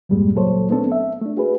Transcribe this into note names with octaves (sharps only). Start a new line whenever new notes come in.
E2 G2 A#2 G3 G#3
C#2 A#2 F#3 A4 C5 C#5
A3 B3 C4 D4 A4
E5
A3 D4
F#4 G#4 B4